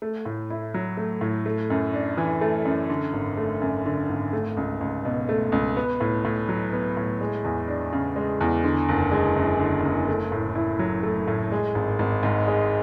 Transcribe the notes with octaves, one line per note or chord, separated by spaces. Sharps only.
A3
A2
E4
F#3
A3
A2
A3
F#2
D4
E3
A3
F#2
D3
G#1
A3
F#2
D3
G#1
A3
C#2
C#2
B2
A3
C#2
B3
A2
A2
F#3
B3
A2
G#3
E2
D4
C#3
G#3
E2
D3
F#1
G#3
F#2
D3
F#1
A3
A2
E4
F#3
A3
A2
G#3
G#1
G#1
G#2
G#3